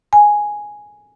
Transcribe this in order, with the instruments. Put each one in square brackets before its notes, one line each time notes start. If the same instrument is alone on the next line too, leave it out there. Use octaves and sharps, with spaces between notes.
[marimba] G#5